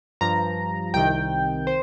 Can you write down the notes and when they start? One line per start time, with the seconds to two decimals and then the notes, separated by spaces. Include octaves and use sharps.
0.21 G2 F3 A#5
0.94 C2 C3 D#3 G5
1.67 C5